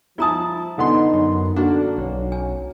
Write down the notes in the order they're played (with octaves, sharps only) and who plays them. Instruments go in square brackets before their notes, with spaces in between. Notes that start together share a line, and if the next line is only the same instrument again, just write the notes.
[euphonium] F3 [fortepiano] E4 A5 [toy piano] F4 A#5 D#6
[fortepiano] D3 B3 C6 [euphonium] D#4
[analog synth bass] F#2
[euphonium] D3 [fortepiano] A#3 F#4 [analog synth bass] D4
[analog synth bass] B1 [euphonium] C#4
[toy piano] G#5